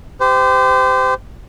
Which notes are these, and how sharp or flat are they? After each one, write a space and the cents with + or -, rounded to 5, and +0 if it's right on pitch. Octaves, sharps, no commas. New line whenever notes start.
G4 +0 C5 -30